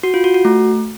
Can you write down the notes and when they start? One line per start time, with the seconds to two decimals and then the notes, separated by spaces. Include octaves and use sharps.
0.03 F#4
0.14 F4
0.24 F#4
0.34 F#4
0.45 A3